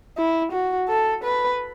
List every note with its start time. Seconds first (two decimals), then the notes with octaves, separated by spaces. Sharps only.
0.18 E4
0.52 F#4
0.89 A4
1.24 B4